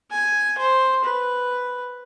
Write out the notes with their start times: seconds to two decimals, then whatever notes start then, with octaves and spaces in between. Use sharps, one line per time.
0.11 G#5
0.58 C5
1.04 B4